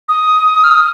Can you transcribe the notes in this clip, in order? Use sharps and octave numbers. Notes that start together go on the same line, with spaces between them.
D#6
F6
D#6